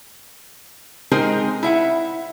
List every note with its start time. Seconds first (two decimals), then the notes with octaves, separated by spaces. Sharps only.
1.11 G#3 C4 D#4 G#4 A#4 C5
1.63 E4 E5 F#5